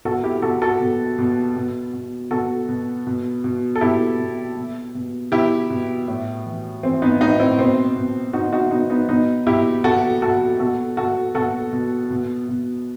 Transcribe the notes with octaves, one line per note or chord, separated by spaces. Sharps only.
B2 F#4 A4
E4 G4
B2 F#4 A4
F#4 A4
B2
B2
B2
B2
B2 F#4 A4
B2
B2
B2
A4
B2 E4 G4
B2
B2
B2
B2 E4 G4
B2
A2
E3
E3 C4
B3 D#4
A2 B3 D#4
C4 E4
B2 C4
B2
B2 D#4 F#4
D#4 F#4
B2 B3 D#4
B3 D#4
B2 B3 D#4
B2 E4 G4
B2 F#4 A4
B2 F#4 A4
B2 F#4 A4
B2 F#4 A4
B2 F#4 A4
B2
B2
B2